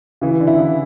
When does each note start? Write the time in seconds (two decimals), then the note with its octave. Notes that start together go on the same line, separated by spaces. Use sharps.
0.21 C#3 E3
0.40 D3
0.47 E4
0.59 C#3 E3